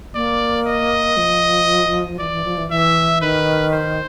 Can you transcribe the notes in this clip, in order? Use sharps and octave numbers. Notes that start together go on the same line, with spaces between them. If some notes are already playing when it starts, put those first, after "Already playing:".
A#3 D5
D#5
F3
E3 D5
E3
F3
E3
E3 E5
D#3 B4
C5